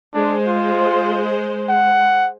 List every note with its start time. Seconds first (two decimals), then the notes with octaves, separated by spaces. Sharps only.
0.14 G#3 D4 C5
0.47 F4
1.69 F#5